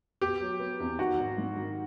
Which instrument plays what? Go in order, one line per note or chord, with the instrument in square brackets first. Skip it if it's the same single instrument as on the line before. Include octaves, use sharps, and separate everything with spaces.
[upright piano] B3 [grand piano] G4
[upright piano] F#3
B3
E2
[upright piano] D#3 [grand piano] F#4
[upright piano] G#1
G#2
D#3